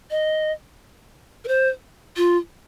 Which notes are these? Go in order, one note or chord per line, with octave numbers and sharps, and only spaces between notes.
D#5
A#4
C5
F4